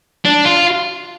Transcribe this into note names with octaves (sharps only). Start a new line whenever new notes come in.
D4
F4